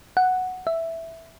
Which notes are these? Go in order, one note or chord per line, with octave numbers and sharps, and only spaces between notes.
F#5
E5